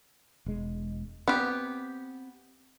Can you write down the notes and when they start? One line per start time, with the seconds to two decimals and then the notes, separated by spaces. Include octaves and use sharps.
0.46 E1 G#3
1.28 B3 C4 G4